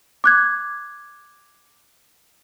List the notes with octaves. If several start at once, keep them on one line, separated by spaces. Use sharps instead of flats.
D6 F#6 G#6